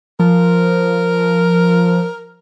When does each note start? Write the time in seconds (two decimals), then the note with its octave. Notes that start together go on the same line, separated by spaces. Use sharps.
0.20 F3 A#4